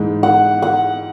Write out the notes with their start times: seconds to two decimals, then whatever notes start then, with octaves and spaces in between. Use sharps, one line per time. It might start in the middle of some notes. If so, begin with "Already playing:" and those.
Already playing: G#2 E3 G#3
0.23 F#5
0.62 F#5